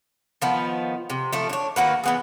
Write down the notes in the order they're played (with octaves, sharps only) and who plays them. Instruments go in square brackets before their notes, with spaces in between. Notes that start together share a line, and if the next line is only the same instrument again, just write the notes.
[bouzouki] D#3 F3 B3
C3
F3 A3
D4 C#5
D#3 A#3 F#4 B4
E3 B3 G#4